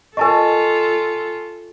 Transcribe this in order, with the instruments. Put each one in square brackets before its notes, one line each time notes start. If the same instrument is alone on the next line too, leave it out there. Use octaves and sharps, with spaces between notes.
[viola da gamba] F4 A4 [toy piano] A#4 D#5 [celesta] G#5 A5 C#6